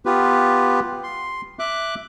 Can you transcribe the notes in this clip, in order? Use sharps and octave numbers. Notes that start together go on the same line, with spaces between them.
B3 F4 G4 B4
C6
E5 D6 F#6